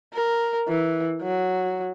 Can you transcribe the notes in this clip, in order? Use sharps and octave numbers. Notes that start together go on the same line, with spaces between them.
A#4
E3
F#3